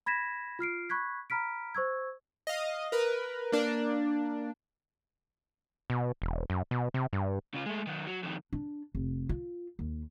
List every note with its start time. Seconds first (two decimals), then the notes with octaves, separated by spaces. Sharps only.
0.06 B5 G#6 A#6 B6 E7
0.59 F4 F6 C7 D7
0.89 B5 C#6 F#6 G#6 B6
1.30 A#5 B5 F6 B6 D7
1.75 C5 C#6 E6 G#6
2.47 D#5 F5
2.92 A#4 B4
3.52 A#3 D4
5.90 B2
6.22 E1
6.50 F#2
6.71 B2
6.94 C3
7.13 G2
7.54 C#3 F4
7.66 G#3 A3
7.87 D#3 F#3
8.07 F#3
8.23 F2 D#3
8.53 D4
8.95 F1
9.29 F4
9.79 D#2